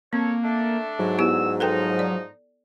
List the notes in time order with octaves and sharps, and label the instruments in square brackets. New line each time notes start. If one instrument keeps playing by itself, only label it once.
[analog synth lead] A#3 [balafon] C4 [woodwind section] A4 C#5
[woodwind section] A3 D4
[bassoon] G#2 [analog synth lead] F#3
[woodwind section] G2 E6 [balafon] B3 E4 G4
[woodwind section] F3 D#4 [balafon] A4 B4 G5
[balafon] D5